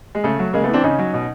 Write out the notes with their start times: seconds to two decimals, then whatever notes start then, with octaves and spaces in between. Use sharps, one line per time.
0.15 G#3
0.24 C#3 A3
0.39 F#3
0.53 C#3 G#3 A#3
0.63 A3 B3
0.69 E3 C4 D4
0.83 C#3 C#4 D#4
0.99 F#3
1.13 B2